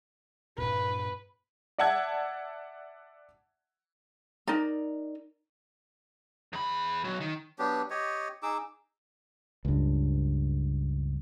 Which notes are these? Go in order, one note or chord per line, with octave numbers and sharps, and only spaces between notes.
G2 A#2 B4
D5 E5 F#5 A5 E6 G#6
D#4 A#4 D5 A#5
E2 B5
B1 F#3
D#3
F#3 B3 D4 G4
G4 C#5 D#5
D#4 G#4 D6 E6
C#2 G2